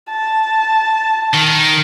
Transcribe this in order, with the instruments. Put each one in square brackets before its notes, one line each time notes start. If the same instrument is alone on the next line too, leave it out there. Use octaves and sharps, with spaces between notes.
[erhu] A5
[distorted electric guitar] D#3